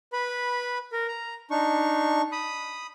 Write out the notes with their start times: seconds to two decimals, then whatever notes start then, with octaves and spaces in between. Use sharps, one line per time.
0.13 B4 B5
0.92 A#4
1.08 A#5
1.51 D4 D#4 C#6
2.32 B5 D#6